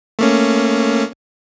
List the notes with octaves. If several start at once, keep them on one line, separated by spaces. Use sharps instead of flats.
A3 A#3 C#4